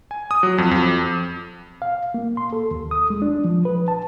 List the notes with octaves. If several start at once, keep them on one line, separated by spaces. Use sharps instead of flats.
G#5
D#6
F#3
F2
F2
F5
A#3
C6
A4
D#2
D#6
G#3
D4
F3
B4
A5